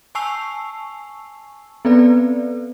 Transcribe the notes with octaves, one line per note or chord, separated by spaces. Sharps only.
G#5 A5 C#6 E6 C7 F7
B3 C4 A4 B4 D5